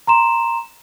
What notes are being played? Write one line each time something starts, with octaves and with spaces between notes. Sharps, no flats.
A#5 C6 E7